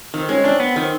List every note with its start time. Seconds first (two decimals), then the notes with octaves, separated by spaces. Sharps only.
0.14 D#3 C4
0.29 G#3 C#4
0.44 C4 D4
0.60 B3
0.76 D#3 C4